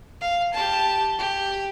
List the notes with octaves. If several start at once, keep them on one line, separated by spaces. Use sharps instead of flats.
F5
G4 A5
G4